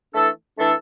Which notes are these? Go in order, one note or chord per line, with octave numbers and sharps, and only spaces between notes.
E3 A3 D4 A4
E3 A3 D4 A4